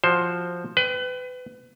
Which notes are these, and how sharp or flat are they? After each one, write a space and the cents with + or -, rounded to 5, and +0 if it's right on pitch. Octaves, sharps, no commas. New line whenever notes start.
F3 +0 F#4 +0 C5 +10
B4 +30 G5 +0